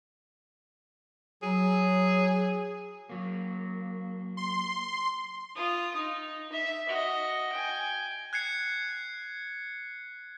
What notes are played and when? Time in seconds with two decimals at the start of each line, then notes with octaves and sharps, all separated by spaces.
1.42 F#3 G#4
3.09 F#3 A#3
4.37 C6
5.56 F4 D#6
5.95 D#4
6.52 E5
6.89 F#4 D#5
7.52 G5 G#5
8.33 F#6 G#6 C7 C#7